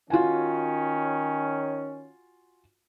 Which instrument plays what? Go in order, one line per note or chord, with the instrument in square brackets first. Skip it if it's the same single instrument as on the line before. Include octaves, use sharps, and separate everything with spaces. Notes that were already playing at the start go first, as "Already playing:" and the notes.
[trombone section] D#3 C#4 [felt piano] F4 F#4 G#5